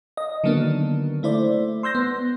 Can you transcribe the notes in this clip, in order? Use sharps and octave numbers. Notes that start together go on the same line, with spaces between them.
D#5
D3 D#3 F#3 A#3 B3 D4
A3 E4 C5 D5
C6 E6 G6 A#6
B3